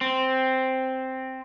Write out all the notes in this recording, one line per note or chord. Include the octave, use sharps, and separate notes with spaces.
C4